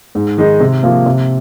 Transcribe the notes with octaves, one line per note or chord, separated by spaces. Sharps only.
G#2
D#3 G#3 D#4
C3
F3 A#3
C3